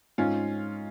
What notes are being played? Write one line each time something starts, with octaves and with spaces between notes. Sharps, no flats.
G#2 C#4 F4